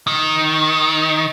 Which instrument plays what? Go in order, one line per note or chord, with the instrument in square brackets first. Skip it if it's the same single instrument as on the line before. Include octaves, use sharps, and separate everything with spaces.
[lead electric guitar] D#3